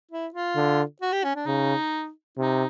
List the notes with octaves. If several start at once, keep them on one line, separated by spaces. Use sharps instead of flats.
E4
F4
D3
F#4
G4
C#4
D4
C#3 D#4
C3 D#4